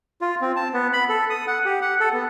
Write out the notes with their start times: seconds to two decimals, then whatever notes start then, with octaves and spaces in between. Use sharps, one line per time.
0.21 F4
0.41 C4
0.56 A5
0.74 B3
0.93 B5
1.09 A4
1.30 D#6
1.47 F#5
1.65 G4
1.81 F#5
2.00 A4
2.13 B3